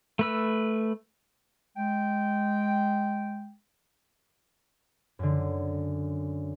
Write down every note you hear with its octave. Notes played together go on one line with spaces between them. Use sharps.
A3 B4 E6
G#3 G5
F#2 D3